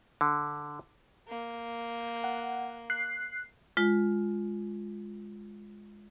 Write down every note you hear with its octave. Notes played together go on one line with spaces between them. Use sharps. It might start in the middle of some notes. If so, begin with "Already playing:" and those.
D3
A#3
F#5
F#6 C7
G#3 F4